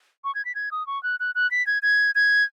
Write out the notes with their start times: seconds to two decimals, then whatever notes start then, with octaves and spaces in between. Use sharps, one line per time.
0.24 C#6
0.35 G#6
0.45 B6
0.55 G#6
0.72 D#6
0.87 C#6
1.03 F#6
1.20 F#6
1.35 F#6
1.51 B6
1.67 G#6
1.83 G#6
2.15 G#6